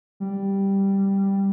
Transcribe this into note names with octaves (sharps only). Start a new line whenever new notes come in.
G3